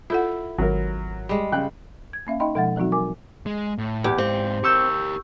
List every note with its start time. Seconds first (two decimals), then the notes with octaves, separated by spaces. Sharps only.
0.10 E4 F4 A4 F#5
0.58 G#1 F#3 A#4
1.29 G3 G#3
1.52 C#3 G5 F#6
2.13 G#6
2.27 A#3 C#4 E5 F5
2.40 D#4 D#5 E5 G5 B5 C6
2.55 B2 F3 G#3 E5 F#5 A6
2.76 E3 F#3 C4 D#4 F#4
2.92 A#4 G#5 D6
3.46 G#3
3.78 A2
4.04 E2 G4
4.18 G#2 C4 F5
4.64 G4 A#4 C#6 E6 G6